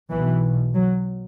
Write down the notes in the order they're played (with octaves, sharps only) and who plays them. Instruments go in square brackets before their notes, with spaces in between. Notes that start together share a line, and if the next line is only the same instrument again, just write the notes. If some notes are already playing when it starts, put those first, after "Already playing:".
[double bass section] B1 B2 E3
F#3